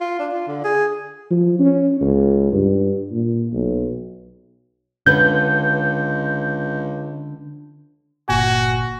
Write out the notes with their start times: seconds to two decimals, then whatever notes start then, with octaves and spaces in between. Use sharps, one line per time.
0.01 F4
0.19 D4
0.33 F4
0.47 D3
0.64 G#4
1.31 F3
1.59 C#4
2.01 C#2
2.52 G2
3.11 A#2
3.53 B1
5.06 C#2 D3 B4 G6
8.29 G1 A#2 F#4 G#5